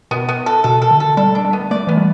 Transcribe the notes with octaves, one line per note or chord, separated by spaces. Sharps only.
B2 B3
B3
A4
B2 A4
A4
D3
A4
G3 A4
D4
G3
B3
A3 D5
E3 B3
G3